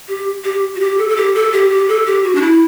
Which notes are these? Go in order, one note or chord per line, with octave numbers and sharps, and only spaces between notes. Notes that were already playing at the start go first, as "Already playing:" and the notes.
G4
G4
F#4
G4
A4
A4
G4
A4
G4
G4
A4
G4
F#4
D4
E4